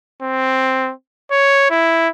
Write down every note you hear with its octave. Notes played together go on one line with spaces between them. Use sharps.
C4
C#5
E4